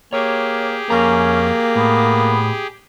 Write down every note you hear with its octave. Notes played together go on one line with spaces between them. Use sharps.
A#3 G4 G#4 C#5
F2 A#3 C#4 A#5
A2 B3